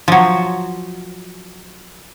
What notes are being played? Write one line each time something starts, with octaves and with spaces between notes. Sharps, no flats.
F3 F#3